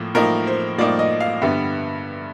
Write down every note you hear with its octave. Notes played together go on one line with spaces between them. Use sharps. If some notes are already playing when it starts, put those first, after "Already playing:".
Already playing: A2 F3 A#3
A2 F3 A#3 D#4 A#4
C5
A2 F3 A#3 D#4 D5
D#5
F5
G2 D3 G3 B3 E5